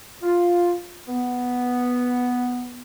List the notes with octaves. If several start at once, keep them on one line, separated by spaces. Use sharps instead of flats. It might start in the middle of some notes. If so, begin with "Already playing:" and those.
F4
B3